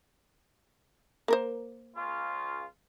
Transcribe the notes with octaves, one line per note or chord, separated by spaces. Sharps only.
A#3 A#4 C5
C#2 C#3 F4